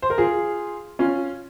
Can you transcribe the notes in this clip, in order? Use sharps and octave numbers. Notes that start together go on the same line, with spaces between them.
C5
A#4
F4 G#4
C#4 F4